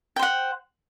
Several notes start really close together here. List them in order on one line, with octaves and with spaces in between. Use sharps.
G5 C5 F#5